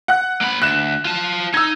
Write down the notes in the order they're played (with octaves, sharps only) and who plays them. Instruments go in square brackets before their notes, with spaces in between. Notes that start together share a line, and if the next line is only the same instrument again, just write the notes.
[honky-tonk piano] F#5 F#6
[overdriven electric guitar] A#3 B5
[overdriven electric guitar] D2 [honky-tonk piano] F#6 E7
[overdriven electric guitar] F4 A5
[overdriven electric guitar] D#4 [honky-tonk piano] E6 G#6